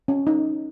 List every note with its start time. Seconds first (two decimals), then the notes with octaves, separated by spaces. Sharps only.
0.08 C#4
0.27 D#4